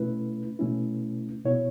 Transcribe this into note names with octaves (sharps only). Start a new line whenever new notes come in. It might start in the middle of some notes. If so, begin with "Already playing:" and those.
Already playing: B2 A3 C#4 E4 B4
B2 A3 C#4 E4
B2 B3 E4 C#5